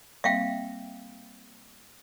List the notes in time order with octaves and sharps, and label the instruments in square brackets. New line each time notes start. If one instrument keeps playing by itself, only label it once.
[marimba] G3 A#3 C4 [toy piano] E5 F5 G5